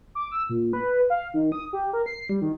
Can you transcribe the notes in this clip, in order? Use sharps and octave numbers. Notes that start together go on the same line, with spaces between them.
D6
E6
A#2
B4
F5
D#3
D#6
G4
A#4
C7
G3
D#3